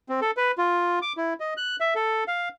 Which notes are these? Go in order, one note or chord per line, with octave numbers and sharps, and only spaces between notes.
C4
A4
B4
F4
D6
E4
D#5
F#6
E5
A4
F5